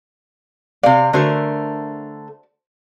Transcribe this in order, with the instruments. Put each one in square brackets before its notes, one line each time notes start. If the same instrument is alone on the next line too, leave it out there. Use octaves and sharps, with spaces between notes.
[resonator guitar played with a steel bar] C3 F5 [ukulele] D5
[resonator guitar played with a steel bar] D3 A3 A#4 [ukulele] F#4 C5 D5